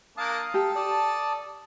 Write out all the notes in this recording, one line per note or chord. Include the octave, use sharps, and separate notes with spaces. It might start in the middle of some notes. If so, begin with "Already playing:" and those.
A#3 D4 F5 A5 D#6
G4 A4
D5 A5 D#6